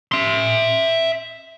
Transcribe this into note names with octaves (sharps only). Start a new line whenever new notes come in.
E5 C6